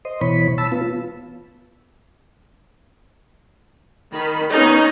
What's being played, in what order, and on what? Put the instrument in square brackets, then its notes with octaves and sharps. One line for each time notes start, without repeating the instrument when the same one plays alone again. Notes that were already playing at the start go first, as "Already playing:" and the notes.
[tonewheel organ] C5 D#5
B2 E3 C#5 B5
A5 B5 E6
B3 F4
[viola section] D#3 B5
B3 C#4 D#4